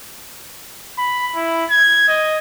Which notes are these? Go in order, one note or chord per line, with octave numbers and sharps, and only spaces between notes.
B5
E4
G#6
D#5